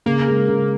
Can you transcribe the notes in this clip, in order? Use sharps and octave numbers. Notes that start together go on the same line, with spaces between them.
C#3 A#3
G#3
C#3